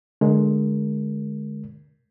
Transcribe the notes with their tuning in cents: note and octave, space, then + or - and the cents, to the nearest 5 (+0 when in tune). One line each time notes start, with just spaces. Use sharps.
D3 +15 G#3 +20 A#4 +10